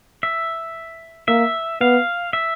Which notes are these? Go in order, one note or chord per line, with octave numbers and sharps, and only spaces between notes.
E5
A#3 E5
B3 F5
E5